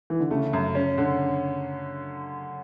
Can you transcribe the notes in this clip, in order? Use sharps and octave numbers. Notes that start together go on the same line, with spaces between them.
E3
D3
C#3 A3
F#2
C#4
D3